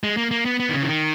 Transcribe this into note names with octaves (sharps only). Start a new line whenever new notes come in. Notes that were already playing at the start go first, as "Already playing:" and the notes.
G#3
A#3
A#3
B3
B3
D#3
C#3
E3
D#3